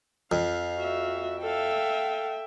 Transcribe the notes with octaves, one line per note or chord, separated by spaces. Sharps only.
F2 F5
F#4 E5
A4 E5 F5 G5